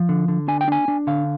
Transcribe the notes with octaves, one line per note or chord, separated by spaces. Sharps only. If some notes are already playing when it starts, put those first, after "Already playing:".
Already playing: F3
D3
D3
D4 G#5
G5
D4 G#5
D4
D3 F5